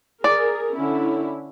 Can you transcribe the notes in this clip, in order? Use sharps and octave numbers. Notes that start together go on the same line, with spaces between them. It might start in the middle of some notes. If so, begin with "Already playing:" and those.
G#4 A#4 D5
D3 C#4 E4